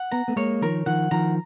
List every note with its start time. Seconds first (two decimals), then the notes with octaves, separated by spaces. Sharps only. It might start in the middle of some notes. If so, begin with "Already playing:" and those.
Already playing: F#5
0.11 B3 A#5
0.28 A3 B3
0.36 G#3 A#3 C#5
0.62 D#3 F3 A#4
0.86 D#3 F3 F#5
1.11 D#3 F3 A#5